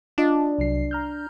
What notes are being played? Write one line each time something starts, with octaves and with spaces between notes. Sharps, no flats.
D4 F4 D#5
C2 F#3 C7
A#5 F6 G6